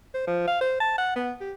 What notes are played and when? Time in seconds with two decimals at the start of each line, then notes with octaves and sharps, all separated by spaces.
0.14 C5
0.27 F3
0.47 F5
0.61 C5
0.80 A5
0.98 F#5
1.15 B3
1.40 G4